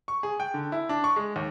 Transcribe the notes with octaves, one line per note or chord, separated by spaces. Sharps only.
C#6
G#4
G5
D3
E4
D4
C#6
G#3
D#2